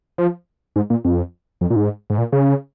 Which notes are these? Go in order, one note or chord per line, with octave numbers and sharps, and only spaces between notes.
F3
G#2
A#2
F2
F2
A#2
G#2
G#2
A#2
C#3